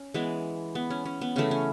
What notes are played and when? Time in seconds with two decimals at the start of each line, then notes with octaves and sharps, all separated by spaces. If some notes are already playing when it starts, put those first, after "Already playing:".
Already playing: C#4
0.14 E3 G#3 B3
0.75 B3
0.90 C#4
1.05 C#4
1.21 B3
1.36 C#3 E3 A3 C#4
1.51 C#4